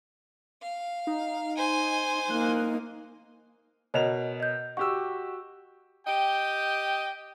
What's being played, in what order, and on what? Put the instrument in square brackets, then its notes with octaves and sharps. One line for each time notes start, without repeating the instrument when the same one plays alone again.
[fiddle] F5
[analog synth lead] D#4
[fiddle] C5 G#5
[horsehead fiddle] A#3 D#4 [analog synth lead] F#6
[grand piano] B2 A#4 F7 [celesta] C#5 D#5
[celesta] D#5 G6
[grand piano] F#4 G4 E6 [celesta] C#6
[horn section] G4 D#5 G5